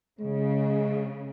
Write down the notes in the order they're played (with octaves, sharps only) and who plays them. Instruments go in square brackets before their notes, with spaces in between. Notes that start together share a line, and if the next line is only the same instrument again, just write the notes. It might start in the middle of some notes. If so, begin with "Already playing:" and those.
[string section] C#3 [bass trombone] G#3